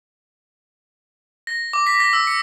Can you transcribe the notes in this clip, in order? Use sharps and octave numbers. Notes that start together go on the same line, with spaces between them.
A#6
D6
B6
A#6
E6
C#7